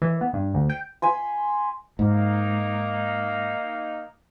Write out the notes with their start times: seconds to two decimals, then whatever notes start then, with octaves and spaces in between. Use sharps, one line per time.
0.02 E3
0.21 B3
0.33 G2
0.54 D2
0.70 G5
1.02 G#5 B5 C6
1.99 G#2 A#3 D#4